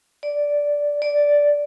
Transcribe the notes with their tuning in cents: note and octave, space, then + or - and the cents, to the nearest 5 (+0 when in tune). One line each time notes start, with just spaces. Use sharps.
D5 -5
D5 -5